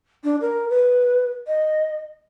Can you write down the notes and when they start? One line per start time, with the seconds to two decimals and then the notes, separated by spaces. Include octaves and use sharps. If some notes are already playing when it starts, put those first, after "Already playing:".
0.24 D4
0.41 A#4
0.70 B4
1.47 D#5